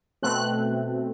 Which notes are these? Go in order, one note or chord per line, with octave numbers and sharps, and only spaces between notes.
B2 A3 C4 F#6